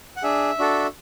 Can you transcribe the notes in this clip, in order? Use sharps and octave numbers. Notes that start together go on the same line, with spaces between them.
F#5
D4 G#4 E5
D4 F#4 A4